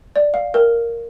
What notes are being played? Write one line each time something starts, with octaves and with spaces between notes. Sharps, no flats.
D5
F5
A#4